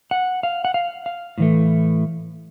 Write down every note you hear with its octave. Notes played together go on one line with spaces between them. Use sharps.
F#5
F5
F#5
F5
F5
A2 E3 A3